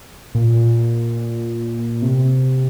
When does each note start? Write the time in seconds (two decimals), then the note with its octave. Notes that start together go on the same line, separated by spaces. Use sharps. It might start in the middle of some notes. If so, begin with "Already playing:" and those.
0.35 A#2
2.02 C3